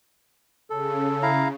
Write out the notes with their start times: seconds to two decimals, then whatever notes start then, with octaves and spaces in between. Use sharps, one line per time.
0.70 C#3 A4
1.23 E4 F5 A#5